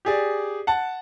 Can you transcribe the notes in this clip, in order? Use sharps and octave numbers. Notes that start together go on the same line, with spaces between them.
G4 G#4 D5
F#5 A5